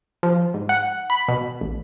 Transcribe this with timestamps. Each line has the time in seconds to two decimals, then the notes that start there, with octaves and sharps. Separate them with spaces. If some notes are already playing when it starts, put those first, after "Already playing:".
0.23 F3
0.54 G#2
0.69 F#5
1.10 B5
1.28 B2
1.61 A1